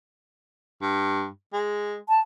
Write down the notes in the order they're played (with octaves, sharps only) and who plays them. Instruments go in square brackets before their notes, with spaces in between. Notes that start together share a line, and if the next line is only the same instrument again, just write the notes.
[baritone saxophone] G2
G#3
[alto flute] A5